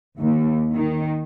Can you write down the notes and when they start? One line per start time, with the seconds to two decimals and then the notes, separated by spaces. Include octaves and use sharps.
0.19 D#2
0.74 D#3